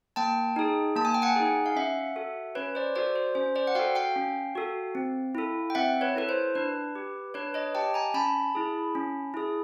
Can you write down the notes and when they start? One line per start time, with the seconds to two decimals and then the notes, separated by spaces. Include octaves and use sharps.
0.16 A#3 G5 A5
0.56 D#4 G#4
0.96 A#3 A5
1.05 G#5
1.14 G5
1.22 F#5 G#5
1.36 D#4 G#4
1.66 F5
1.76 C#4 E5 F#5
2.16 F#4 A4
2.55 C#4 B4 C#5
2.75 C5 D5
2.95 F#4 A4 C5 D5
3.16 C5
3.35 C#4 C5
3.56 C5 D5
3.67 F#5
3.75 F#4 A4 F5 G5
3.95 F5 G5
4.16 C#4
4.55 F#4 A4
4.95 C4
5.35 E4 A4
5.70 G5
5.75 C4 E5 F#5
6.01 B4 C#5
6.16 E4 A4 B4
6.29 C5
6.55 D4 B4
6.95 G4
7.34 D4 B4 C#5
7.54 C#5 D#5
7.75 G4 G5 A5
7.94 G#5 A#5
8.14 C#4 A5 B5
8.55 E4 G#4
8.95 C#4
9.34 E4 G#4